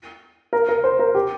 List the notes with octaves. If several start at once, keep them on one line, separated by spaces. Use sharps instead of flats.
A#4
A#4
C5
A#4
G4